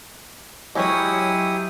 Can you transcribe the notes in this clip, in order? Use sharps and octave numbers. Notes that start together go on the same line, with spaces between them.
F#3 G#3 C#4 E4 G4 C#5 D#6